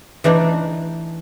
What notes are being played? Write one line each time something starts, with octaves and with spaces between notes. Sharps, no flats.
E3 A3 D4 D#4